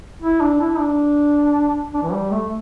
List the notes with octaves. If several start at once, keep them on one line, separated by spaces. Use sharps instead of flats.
E4
D4
E4
D4
D4
E3
G3
A3